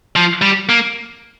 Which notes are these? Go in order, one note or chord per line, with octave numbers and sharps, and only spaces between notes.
F3
G3
A#3